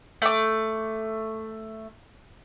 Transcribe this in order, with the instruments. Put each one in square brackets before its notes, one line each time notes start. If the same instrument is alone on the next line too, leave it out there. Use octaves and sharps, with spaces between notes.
[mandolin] A3 D6